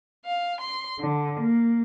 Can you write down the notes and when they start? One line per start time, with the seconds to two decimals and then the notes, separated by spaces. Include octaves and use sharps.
0.24 F5
0.60 C6
1.00 D3
1.41 A#3